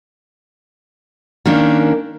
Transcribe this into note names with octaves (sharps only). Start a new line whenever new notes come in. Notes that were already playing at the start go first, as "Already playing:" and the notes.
D#3 A#3 C#4 D4